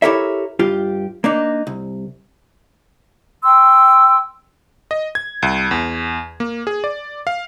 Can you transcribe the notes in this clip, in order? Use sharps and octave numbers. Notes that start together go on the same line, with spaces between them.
E4 G4 A4 A#4 C#5 E5
G2 F4 G4
A#3 D4 D#4
C2
G5 C6 E6
D#5
G#6
C2
E2
A#3
G#4
D5
F5